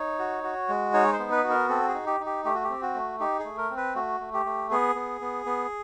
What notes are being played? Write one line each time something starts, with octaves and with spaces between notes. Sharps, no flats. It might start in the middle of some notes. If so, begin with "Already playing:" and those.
Already playing: D#4 C#5
F#4
F#4
G#3
D#4 C#5
C5
B3
B4
F#4
A#4
C4 A4
G#4
D#4
G4
D#4
G4
A3 G4
F#4
G4
C4
F#4
A3
D#4 G4
G#4
A3
A#4
C4
B4
A3 F#4
A3
G4
A3
B3 G#4
B3
B3
B3